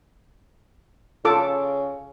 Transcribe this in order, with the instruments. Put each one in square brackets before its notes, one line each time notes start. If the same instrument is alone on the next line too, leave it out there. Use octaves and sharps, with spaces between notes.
[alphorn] C#3 [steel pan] F4 A4 D6